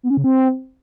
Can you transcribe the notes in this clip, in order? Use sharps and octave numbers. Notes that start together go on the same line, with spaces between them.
B3
C#4
C#3
C4